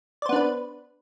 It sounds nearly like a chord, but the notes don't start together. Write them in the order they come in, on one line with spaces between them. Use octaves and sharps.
D5 C5 B3 D4 B4